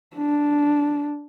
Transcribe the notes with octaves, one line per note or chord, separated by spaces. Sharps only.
D4